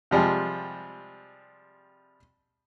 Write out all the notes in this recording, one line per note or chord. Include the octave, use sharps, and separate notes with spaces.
C3 F3 G3 G#3